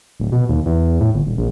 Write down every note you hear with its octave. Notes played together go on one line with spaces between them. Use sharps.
D1
B2
D#2
E2
A2
G1
D#1
A#1